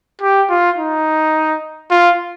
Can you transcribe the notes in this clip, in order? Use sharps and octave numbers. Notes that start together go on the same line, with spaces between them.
G4
F4
D#4
F4